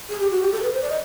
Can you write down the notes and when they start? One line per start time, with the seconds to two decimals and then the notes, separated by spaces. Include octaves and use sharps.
0.09 G#4
0.20 G4
0.31 F#4
0.41 G4
0.52 A4
0.62 B4
0.73 C5
0.82 D5
0.90 D#5